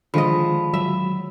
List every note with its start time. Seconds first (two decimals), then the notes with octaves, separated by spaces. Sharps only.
0.14 D3 D#3 F3 G#3 D#5 B5
0.74 F#3 E5